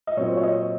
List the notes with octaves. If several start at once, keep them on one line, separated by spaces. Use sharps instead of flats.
D#5
A#2 F#3 C4 C#5
C#5
D#5